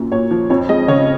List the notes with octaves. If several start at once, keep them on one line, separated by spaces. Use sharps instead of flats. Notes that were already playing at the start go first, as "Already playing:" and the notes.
Already playing: F#2 A#2
A#2 C#5
F3
F2 C#5
G#3 D#5
C#3 C#5